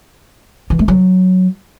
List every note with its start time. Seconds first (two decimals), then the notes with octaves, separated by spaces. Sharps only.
0.70 E3
0.79 A3
0.88 F#3